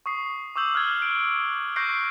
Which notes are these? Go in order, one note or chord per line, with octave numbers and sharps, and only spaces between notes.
C#6 D#6 C7
C#6 D6 E6 G6 F#7
F6 F#6 G#6
F#6 D7
C#6 F#6 G6 A#6 C7 D7